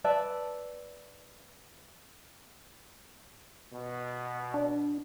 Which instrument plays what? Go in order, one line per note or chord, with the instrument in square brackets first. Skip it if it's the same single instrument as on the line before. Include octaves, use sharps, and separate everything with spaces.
[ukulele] B4 D5 E5 A5
[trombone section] B2
[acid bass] D4